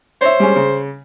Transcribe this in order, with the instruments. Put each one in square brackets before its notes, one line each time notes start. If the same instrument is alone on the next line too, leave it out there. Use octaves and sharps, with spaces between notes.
[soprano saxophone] C5 [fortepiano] C#5 E5
[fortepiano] G3 G#3 C#4
C#3